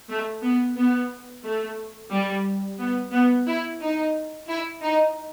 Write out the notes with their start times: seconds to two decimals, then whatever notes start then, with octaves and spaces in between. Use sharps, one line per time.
0.09 A3
0.42 B3
0.76 B3
1.44 A3
2.11 G3
2.79 B3
3.12 B3
3.47 E4
3.81 D#4
4.48 E4
4.82 D#4